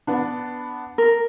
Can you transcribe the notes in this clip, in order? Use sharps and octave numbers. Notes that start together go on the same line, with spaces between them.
B3 D4
A#4